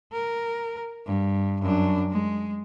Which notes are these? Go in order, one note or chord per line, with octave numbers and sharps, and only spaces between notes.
A#4
G2
F#2 D4
G#3